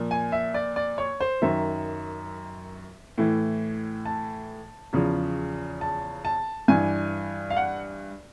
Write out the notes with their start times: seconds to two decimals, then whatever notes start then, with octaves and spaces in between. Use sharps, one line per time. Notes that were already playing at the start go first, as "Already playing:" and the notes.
Already playing: A#2 F3
0.11 G#5
0.32 E5
0.54 D5
0.76 D5
0.98 C#5
1.20 C5
1.42 F#2 D#3 E5
3.18 A2 E3
4.05 A5
4.93 E2 C#3 F3
5.81 A5
6.25 A5
6.68 G2 E3 G#5
7.50 F5
7.57 F#5